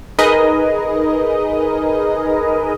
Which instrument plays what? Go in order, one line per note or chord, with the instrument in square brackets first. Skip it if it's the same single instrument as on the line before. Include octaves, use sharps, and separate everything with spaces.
[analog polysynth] D#4 G#4 A#4 B4 D#5